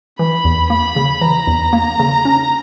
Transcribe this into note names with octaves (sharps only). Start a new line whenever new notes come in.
E3 B5
E2
A#3 B5
C#3
E3 A#5
E2
A#3
C#3
C#4